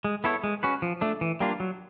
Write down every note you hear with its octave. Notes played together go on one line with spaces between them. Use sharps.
G#3
B3 E4 A4 C#5
G#3
C#4 F#4 B4
F3
A3 D4
E3
G3 A#3 D4 F4
F#3